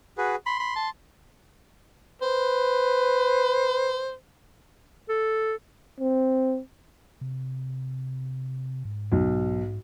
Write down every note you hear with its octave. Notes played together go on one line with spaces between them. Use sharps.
F#4 G#4 B4
B5 C6
B5
A5
B4 C5
A4
C4
C3
G#2
B1